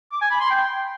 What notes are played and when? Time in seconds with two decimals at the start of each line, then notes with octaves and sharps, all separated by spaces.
0.12 D6
0.21 G#5
0.31 B5
0.40 C6
0.50 G5